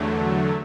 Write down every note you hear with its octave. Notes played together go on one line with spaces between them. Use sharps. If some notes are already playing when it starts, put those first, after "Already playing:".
Already playing: E2 D3 F#3 A3